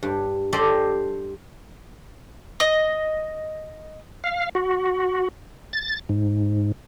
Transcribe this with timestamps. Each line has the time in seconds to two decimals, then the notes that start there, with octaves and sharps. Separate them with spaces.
0.03 G2
0.53 G4 A4 C5 D5 D#5
2.60 D#5
4.24 F5
4.55 F#4
5.73 A6
6.09 G#2